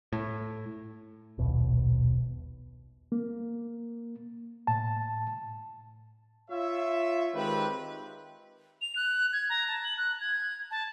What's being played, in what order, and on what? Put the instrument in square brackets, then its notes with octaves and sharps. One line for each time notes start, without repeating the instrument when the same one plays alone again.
[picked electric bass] A2
D#1 B1 B2
[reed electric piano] A#3
A2 A5
[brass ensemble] F4 C#5 E5
D#3 G#3 C4 G4 B4
[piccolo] F7
F#6
G#6
A#5
A5
F#7
F#6
G#6
A5